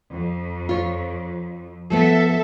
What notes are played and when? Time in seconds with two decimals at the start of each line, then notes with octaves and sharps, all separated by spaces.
0.11 F2
0.69 F4 C#5
1.90 F3 A3 B3 A4 E5